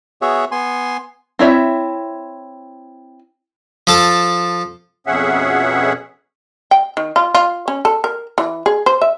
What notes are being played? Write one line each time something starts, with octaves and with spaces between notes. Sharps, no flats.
B3 F#4 G#4 C#5 E5
B3 G#5 C6
C4 E4 C#5 E5
F3 A4 A5
F2 B2 C#4 G#4 E5 F#5
G5
D#3
F4
F4
C#4
A4
A#4
E3
G#4
C5
E5